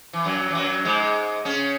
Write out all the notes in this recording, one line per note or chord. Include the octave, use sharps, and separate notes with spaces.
E3
F#2 F#3
E3
F#2 F#3
G#2 G#3
C#3 C#4